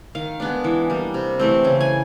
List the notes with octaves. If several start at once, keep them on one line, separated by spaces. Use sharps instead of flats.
D#3 F5
G#3 B3 D4
E3
G3 A#3
C3
E3 A3 C4
C#3
G#5